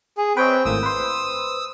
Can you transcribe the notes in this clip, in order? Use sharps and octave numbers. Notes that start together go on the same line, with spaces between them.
G#4
C4 B4 C#5 D#5 G5
G#1 A2 A#3 D#6 E6
B4 C5